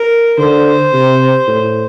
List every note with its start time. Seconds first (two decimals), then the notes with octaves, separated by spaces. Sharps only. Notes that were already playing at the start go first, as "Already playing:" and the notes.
Already playing: A#4
0.38 D3 C5
0.93 C3
1.47 A2